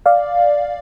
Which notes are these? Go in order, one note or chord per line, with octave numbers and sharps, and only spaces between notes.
D5 F5